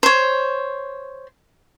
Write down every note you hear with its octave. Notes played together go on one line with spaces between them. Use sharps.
C5 C#5